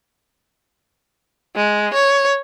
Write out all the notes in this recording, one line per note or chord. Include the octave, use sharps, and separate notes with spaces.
G#3
C#5